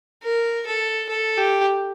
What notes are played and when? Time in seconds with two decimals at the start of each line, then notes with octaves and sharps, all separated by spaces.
0.23 A#4
0.67 A4
1.09 A4
1.37 G4